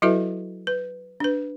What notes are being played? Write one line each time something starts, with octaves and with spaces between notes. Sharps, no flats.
F#3 E4 F#4 A4 B4 E5
B4
D4 B4